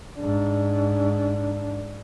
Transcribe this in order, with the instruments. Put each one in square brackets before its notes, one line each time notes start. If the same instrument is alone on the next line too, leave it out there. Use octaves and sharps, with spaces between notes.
[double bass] G#2 D4